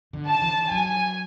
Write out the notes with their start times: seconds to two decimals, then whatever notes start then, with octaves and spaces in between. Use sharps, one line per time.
0.13 D3
0.27 A5
0.42 E3
0.71 F#3 G#5